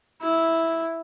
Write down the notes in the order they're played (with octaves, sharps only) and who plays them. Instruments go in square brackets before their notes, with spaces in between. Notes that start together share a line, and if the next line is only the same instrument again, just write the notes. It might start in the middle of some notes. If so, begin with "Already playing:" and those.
[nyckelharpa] E4